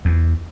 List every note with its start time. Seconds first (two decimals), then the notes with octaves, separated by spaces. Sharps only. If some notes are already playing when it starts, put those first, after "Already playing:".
0.05 E2